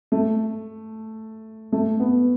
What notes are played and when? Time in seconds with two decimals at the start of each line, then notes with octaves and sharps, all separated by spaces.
0.12 A3
1.72 A3
2.00 B3